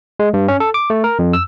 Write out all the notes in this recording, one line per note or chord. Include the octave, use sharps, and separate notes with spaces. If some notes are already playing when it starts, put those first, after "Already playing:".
G#3
G2
C#4
A4
D6
A3
A#4
F2
E6